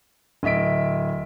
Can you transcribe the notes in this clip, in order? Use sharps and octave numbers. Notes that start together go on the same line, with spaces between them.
D1 D#5 E5 B6 D7